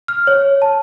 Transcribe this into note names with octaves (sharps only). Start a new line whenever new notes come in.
F6
C#5
A5